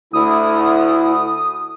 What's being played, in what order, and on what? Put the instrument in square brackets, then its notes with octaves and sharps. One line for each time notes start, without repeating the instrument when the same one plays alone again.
[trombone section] D2 [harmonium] E4 [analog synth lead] D#6